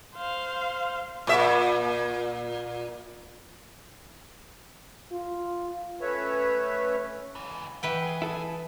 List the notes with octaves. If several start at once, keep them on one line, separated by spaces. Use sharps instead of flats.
C5 F5
A#2 E5
F4
A3 C#4 B4 C#5 E5
C#2 E3
E3 B4 F#5 G5
G#4
E4 A4